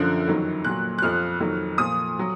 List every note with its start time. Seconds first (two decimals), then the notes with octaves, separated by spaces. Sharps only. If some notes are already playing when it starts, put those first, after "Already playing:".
Already playing: F#2 D3 F3 F#6
0.27 F2 D#3 F#3
0.64 A#2 F#3 F#6
0.98 F#6
1.02 F2 F3 F6
1.40 F2 D#3 F#3
1.78 A#2 F3 D#6
2.19 F#3